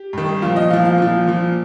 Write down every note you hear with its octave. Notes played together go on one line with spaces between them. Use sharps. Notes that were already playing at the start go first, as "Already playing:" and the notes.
Already playing: G4
G2 D#3
A#2 F3 F4
D#5
A#2 F3 F5
F5
A#2 F3
A#2 F3